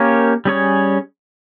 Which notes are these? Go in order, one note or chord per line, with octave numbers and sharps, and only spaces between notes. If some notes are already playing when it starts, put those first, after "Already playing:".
Already playing: A#3 C#4 G4 A#4 C#5
G3 C#4 G#4 C#5